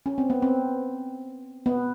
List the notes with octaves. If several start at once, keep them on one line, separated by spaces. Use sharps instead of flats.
C#4
C4
B3
C4
B3